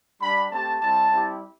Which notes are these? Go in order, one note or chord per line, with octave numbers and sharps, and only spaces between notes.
G3 D4 G4 B5
A3 C4 G4 A5
G3 C4 E4 A5
G3 C4 E4 G4